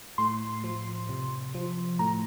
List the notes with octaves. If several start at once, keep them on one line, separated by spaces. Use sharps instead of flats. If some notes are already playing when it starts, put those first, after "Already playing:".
A2 C6
F3
C3
F3
A2 A#5